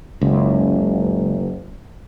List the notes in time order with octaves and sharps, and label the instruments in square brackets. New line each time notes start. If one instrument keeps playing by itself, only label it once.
[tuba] F#1 [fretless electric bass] C#2